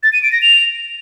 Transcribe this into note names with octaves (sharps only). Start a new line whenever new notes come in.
A6
D#7
D7
A#6
F7